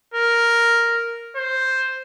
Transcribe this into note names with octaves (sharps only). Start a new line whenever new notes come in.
A#4
C5